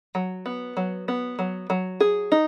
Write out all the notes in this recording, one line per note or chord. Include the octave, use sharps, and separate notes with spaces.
F#3
B3
F#3
B3
F#3
F#3
G#4
D#4